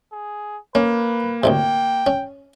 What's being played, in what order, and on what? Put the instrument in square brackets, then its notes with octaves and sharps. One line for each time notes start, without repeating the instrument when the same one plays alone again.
[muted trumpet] G#4
[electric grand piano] A#3 [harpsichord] C#4 [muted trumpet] B4
[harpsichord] D2 A2 C3 [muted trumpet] G5
[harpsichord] C#4